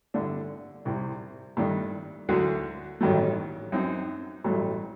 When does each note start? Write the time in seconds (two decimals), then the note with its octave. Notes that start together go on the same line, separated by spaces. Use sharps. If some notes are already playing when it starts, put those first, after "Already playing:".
0.14 G2 D3 A3 D4
0.85 C2 C3 G3
1.57 G2 D#3 A3 D4
2.29 D2 D3 F#3
3.01 A1 G2 D#3 F#3 A3
3.72 F#2 F#3 C4 D#4
4.44 A1 G2 F#3 A3